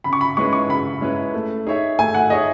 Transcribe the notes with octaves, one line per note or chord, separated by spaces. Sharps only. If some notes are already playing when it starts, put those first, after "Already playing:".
C#3 B5
C#6
B5
G#3 C#4 E4 B4 C#6
C#6
C#3 B5
G#3 C#4 E4 B4
A3
D#4 G#4 C#5 E5
A3 G#5
F#5
D#4 G#4 C#5 D#5 E5